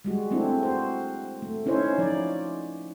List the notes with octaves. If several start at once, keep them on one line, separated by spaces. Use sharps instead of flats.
G3 G#3 F#4
A3 C4 D4 E4
F#4 C5
A3
C#4 D#4 E4 C5 C#5
F3 D#4 D5